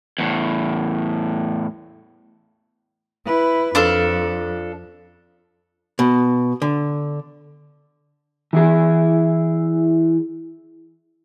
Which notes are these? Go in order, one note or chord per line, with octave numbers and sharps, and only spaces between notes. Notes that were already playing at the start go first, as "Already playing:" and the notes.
E2 A2
E4 B4
F2 D4 F4 A4
B2
D3
E3 E4 G#4